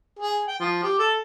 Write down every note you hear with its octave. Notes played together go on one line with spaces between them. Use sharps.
G#4
G5
F3
G4
A4